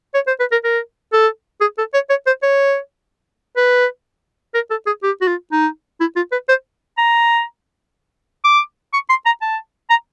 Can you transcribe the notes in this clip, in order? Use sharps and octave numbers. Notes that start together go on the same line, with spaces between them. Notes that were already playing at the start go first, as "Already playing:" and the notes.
C#5
C5
B4
A#4
A#4
A4
G#4
A4
C#5
C#5
C5
C#5
B4
A#4
A4
G#4
G4
F#4
F4
D#4
E4
F4
B4
C5
A#5
D6
C#6
C6
A#5
A5
A#5